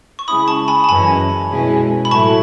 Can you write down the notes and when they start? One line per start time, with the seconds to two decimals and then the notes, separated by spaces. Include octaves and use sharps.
0.19 C#6
0.28 C#3 G#3 C#4 E4 B5 D#6
0.48 A5 C#6
0.68 G#5 B5
0.84 A5
0.89 F#2 E3 G#3 C#4 G#5 B5
1.50 B2 G#3 C#4 E4
2.05 B5
2.11 A2 F#3 A3 E4 A5 C#6